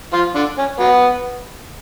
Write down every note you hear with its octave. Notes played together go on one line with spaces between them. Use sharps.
F3 F4
D3 D4
C#4
F#3 B3